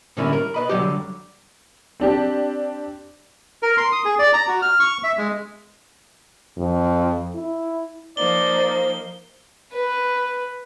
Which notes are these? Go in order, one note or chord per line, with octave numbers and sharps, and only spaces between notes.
A2 D3 G3 A#3 C#4 E4
A#4
B4 D#5 B5
D3 F#3 G3 G4
C4 D4 G4
A#4
C6
D#6
G#4
D5
A#5
F#4
F6
C#6
E5
G#3
F2
E4
F3 A#3 D#4 C5 D5 G7
B4